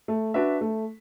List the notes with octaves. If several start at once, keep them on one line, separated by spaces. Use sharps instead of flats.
A3
D4 F#4 B4 E5
A3